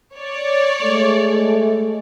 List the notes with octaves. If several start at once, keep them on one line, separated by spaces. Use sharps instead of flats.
C#5 D5
G#3 A3